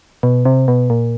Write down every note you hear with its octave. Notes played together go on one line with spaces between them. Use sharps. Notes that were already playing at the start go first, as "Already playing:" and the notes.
B2
C3
B2
A#2